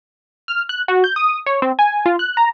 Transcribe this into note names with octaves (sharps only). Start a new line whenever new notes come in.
F6
F#6
F#4
G6
D#6
C#5
C4
G#5
F4
F#6
A#5